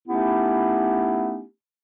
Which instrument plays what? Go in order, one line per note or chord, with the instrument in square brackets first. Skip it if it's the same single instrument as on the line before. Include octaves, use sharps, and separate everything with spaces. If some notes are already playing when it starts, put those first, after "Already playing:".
[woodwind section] A3 B3 C#4 D#4 E4 G4